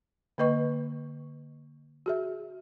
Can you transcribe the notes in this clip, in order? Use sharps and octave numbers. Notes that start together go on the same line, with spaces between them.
D3 A#3 B4 D#5 C#6
F#4 G#4 E5